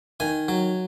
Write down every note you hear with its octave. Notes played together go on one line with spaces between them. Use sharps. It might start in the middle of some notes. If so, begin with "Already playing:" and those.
D#3 G#5
F#3